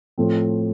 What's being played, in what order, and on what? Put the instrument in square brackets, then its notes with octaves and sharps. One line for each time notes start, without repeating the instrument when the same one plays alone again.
[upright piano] A2 F3 A3 C4